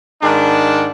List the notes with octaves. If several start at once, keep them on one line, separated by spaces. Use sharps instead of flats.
G#2 D#3 D4